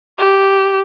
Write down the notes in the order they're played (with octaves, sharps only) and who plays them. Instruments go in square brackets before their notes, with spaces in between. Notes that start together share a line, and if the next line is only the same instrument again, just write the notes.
[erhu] G4